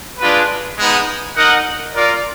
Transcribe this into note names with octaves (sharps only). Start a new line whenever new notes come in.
G#3 D4 F4 B4
G#3 B3 D#4
D#4 A#4 D#5 F#5
F4 A#4 D5